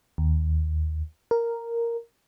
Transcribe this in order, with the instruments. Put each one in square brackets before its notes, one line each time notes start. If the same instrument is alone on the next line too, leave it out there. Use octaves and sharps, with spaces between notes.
[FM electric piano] D#2
A#4